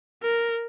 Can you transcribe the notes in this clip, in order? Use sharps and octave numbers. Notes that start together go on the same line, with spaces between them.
A#4